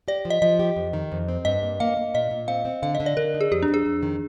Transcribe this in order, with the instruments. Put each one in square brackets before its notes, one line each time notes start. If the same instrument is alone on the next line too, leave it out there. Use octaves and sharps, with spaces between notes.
[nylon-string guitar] G4 [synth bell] D5
[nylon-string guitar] F3
[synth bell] D#5
[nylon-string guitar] F3 [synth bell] D#5
[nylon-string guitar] G4
F2
D#3
F2
C4
[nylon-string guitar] G2 [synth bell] D#5
[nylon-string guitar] A#3
[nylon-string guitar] A#3 [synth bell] F5
[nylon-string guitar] A#3
[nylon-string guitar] A#2 [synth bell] D#5
[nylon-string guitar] A#2
[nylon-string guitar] C4 [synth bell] F5
[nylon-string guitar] C4
[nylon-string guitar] D3 [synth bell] F5
[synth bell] D#5
[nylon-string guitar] D3
[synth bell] D5
[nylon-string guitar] D3 [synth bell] A#4
[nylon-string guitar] D#4
[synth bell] G#4
[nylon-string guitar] F2 [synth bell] G4
[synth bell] D4
[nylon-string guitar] F2
[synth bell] G#4
[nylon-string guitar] F2
D#3